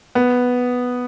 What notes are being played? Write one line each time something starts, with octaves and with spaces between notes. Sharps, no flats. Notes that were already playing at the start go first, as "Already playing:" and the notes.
B3